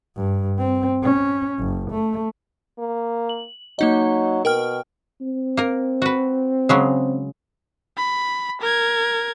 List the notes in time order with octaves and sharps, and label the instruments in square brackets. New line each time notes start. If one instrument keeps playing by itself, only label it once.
[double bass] G2
C4
C#4
F#1
A3
[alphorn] A#3
[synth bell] F#7
[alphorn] F#3 [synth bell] A#3 D#4 D#5
[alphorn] B2 [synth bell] A#4 G5 F6
[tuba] C4
[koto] A#3 A#4
F#4 B4
C#3 F#3 G#3
[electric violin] B5
A#4 G#6